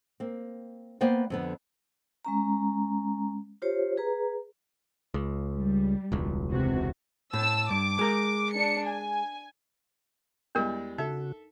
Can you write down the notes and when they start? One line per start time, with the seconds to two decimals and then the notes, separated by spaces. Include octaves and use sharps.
0.20 A#3 C4
1.01 A#3 B3 C5 D5 G5
1.30 F2 D3 B3
2.25 G#3 C#4 A#5
3.62 F4 G4 C5 C#5
3.97 G#4 B4 A#5
5.14 C#2
5.54 G3
6.12 E1 C#2
6.51 C3 F#4
7.33 A2 A5 E6
7.70 G2 D6
7.99 G#3 A#4
8.54 D4 C#7
8.88 G#5
10.55 E2 G3 G#3 D4 A#4
10.98 C#3 D#4 F#4 A4 E5